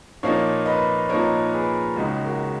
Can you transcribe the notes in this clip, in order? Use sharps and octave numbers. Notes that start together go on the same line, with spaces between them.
A#2 F3 A#3 D#4 C#5 F5
B4 D#5
A#2 F3 A#3 D#4 A#4 C#5
G#4 B4
C#2 C#3 G#3 D#4 F#4
F#4 A#4